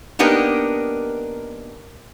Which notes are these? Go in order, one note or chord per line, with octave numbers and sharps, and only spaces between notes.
A#3 B3 D4 D#4 G4 A#4